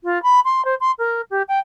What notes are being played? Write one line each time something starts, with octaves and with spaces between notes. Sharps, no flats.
F4
B5
C6
C5
C6
A#4
G4
G5